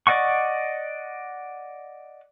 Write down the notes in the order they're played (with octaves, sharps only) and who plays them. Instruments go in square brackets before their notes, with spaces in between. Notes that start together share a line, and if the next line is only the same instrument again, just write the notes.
[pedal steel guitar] D5 D#5 F#5 C#6